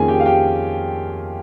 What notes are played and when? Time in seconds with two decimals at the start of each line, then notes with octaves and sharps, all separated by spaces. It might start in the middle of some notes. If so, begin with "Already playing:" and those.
Already playing: F2 D#3 A#3 C#4 G#4 G#5
0.08 G4 G5
0.20 F5
0.26 G4 G5